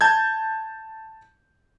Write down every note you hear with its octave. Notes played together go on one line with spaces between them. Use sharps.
A5 G6 G#6